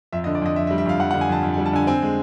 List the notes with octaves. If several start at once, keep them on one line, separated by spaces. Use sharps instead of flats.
F2 E5
D#5
D3
D5
F2 D#5
F2 E5
E5
G3
E5
F2 F5
F2 F#5
F#5
D3
G#5
F2 A5
F2
G#5
G3
A5
D3 G#5
C4 G#5
G#3